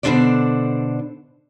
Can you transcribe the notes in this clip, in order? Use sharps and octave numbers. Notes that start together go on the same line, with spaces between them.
B2 D3 D4 A4 C5 D5